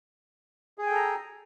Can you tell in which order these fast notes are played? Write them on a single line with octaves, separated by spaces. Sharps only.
G#4 G#5 G5 A4 A#5